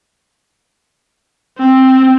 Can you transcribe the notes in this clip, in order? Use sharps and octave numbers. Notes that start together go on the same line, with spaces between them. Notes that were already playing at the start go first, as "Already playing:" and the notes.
C4